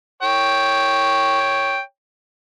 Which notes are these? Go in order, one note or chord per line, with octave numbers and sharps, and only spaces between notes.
C#5 G5